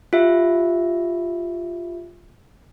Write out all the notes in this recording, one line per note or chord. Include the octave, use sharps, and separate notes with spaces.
F4 G4 E5